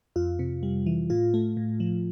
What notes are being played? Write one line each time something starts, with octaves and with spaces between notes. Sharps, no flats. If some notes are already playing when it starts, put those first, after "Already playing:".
F2 F4
C3
G3
E3
A2 F4
A3
A2
F3